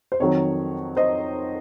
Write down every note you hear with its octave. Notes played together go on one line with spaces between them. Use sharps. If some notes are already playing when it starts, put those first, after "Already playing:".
C5
F2 D#3 F#3 C#5
C5 D#5